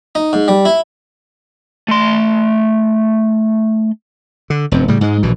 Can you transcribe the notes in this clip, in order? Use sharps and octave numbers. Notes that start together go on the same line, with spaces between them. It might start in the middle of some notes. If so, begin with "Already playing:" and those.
D#4
G#2
G3
E4
A3 C6
D3
F1 G2 C4
A2 C#3 G3
G#2 G#3
A#1 B2 E3